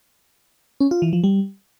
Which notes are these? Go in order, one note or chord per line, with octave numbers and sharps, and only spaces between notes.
C#4
F4
E3
F3
G3